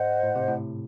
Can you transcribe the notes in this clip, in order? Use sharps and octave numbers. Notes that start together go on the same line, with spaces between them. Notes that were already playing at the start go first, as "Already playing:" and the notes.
Already playing: G#2 C5 D#5 F#5
A2
C3
A2